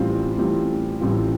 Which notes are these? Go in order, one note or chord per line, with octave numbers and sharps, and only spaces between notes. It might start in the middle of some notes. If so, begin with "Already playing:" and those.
Already playing: A1 A2 G3 C4 F4
A1 A2 G3 C4 F4
A1 A2 G3 C4 F4